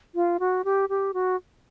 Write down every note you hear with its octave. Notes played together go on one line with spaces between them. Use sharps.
F4
F#4
G4
G4
F#4